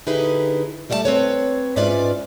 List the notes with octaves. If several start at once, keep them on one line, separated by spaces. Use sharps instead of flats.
D3 D#4 E4 G4 G#4 B4
G3 A3 D5 E5 A5
C4 B4 C#5
G#2 C#4 F4 B4 D5 E5